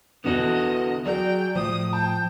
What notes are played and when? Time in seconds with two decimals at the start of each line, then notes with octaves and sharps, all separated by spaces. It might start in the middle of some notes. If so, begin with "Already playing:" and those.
0.24 E2 D3 B3 F#4 A4 D#5
1.06 F#3 G#4 D5 G5
1.56 A2 F3 D#6
1.93 G5 A5